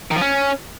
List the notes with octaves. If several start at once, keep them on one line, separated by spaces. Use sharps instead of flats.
D#3
F3
C#4